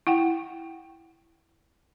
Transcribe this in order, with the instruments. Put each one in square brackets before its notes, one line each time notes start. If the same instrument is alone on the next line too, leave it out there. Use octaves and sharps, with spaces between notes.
[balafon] E4 F#5 G5